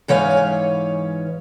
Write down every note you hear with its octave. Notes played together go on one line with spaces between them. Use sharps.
G#2 E3 C#4 C#5 F5 G#5